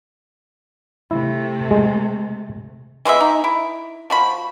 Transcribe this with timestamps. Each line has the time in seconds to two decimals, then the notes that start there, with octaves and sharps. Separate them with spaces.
1.11 C3 A3 E4
1.71 G#3
3.05 E3 G#3 B3 E5
3.20 D#4
3.44 E4
4.10 F3 F#4 B5